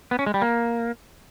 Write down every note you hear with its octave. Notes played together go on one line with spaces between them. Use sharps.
B3
C#4
G#3
G3
A#3